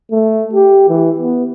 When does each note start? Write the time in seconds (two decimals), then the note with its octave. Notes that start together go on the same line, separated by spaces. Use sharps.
0.12 A3
0.53 G4
0.89 E3
1.19 B3